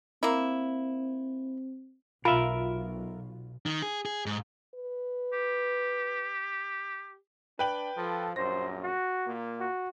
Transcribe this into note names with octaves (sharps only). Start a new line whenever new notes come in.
A#3 C4 E4
B1 F4 A#4 E5 B5
D#3
G#4
G#4
G#2
B4
G4
D4 B4 G5 F#7
F3 A4
A#1 F#2 C5 A#6
F#4
A#2 A#3
F#4